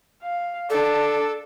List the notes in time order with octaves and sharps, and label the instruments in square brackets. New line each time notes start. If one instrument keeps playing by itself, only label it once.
[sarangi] F5
[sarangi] D4 [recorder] A4